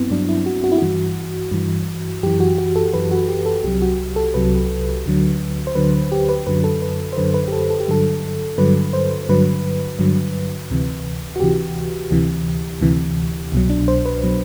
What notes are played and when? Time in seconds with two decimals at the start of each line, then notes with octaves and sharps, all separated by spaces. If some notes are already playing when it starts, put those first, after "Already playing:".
Already playing: G2 F#3 B3 C4 E4
0.10 G2 F#3 D4
0.29 E4
0.46 F#4
0.64 F#4
0.72 E4
0.78 G2 E3 F#4
1.51 G2 E3
2.23 F#2 E3 G4
2.40 F#4
2.58 F#4
2.76 A4
2.93 F#2 E3 B4
3.11 F#4
3.28 G4
3.46 A4
3.63 C2 C3 F#3 G4
3.82 F#4
4.16 A4
4.34 C2 C3 F#3 B4
5.05 D2 D3 F#3
5.67 C5
5.75 D2 D3 F#3 B4
6.12 G4
6.29 B4
6.47 F#2 D3 F#3 B4
6.64 A4
6.82 B4
7.13 C5
7.17 F#2 D3 F#3 B4
7.34 B4
7.48 G4
7.52 A4
7.70 A4
7.80 G4
7.88 G2 D3 F#3 A4
8.58 G2 D3 F#3 B4
8.93 C5
9.29 G2 D3 F#3 B4
9.99 G2 D3 F#3
10.71 D2 C3 E3
11.36 F#4
11.40 D2 C3 E3 G4
12.11 D2 C3 E3
12.81 D2 C3 E3
13.52 C2 B2 F#3
13.70 D4
13.88 C5
14.05 B4
14.23 B2 F#3